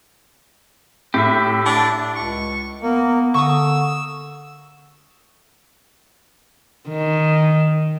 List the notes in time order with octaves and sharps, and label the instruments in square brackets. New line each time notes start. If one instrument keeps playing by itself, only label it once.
[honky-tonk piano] A2 [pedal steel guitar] G4 E5
[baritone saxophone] D4
[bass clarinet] C#2 [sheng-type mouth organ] C#6
[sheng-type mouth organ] A#3 [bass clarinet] B3
[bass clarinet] D3 [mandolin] C#6 D#6 [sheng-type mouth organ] E6
[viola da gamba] D#3